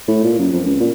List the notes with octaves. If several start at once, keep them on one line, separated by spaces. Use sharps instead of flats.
A2
A#2
F#2
F2
C#2
A#2